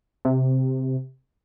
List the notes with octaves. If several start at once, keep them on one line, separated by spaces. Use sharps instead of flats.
C3